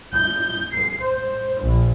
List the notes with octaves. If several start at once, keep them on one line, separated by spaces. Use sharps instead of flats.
G6
C7
C5
A#1